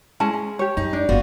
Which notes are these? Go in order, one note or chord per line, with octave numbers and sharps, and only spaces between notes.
G#3 C#4 E4 A5
C#4
G4 C#5
F#2 D#4
D4 D5
F#1 D#2 B3 F4 F#4